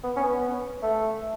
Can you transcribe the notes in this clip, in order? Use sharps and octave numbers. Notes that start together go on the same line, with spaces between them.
B3
C#4
B3
A3